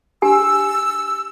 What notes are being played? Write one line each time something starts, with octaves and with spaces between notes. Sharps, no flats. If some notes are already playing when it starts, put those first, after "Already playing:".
D4 G4 G#5 E6